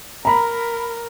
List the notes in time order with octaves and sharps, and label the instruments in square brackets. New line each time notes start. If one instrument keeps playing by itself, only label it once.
[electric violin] A#4 [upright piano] A#5 B5